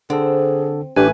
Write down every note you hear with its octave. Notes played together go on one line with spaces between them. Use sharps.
D3 C4 G#4 A4
A1 A3 D4 G4 B4 G#5